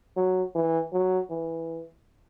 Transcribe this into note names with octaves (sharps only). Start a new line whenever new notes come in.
F#3
E3
F#3
E3